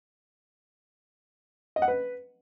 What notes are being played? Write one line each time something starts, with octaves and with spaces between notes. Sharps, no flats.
D#5
F#5
B4